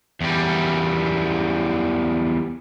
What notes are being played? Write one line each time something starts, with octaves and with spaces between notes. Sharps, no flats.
E2 G3